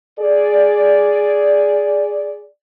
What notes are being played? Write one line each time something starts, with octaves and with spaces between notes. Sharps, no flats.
G#4 D5